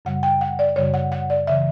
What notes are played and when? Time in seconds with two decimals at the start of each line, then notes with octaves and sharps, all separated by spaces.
0.05 F#2 C#3 G3 F#5
0.23 G5
0.41 F#5
0.59 D5
0.76 F#2 C#3 G3 C#5
0.94 F#5
1.12 F#5
1.30 D5
1.47 C#3 E3 E5